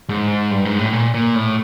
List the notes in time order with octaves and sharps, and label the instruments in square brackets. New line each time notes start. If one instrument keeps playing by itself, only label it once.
[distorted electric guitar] G#2
G2
G#2
A2
A#2
A#2
A2